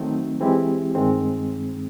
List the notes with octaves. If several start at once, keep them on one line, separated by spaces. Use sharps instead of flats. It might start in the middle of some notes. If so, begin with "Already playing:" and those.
Already playing: D#3 F#3 A3 C4 D#4
E3 G#3 C4 E4 G4
G2 D#3 G#3 C4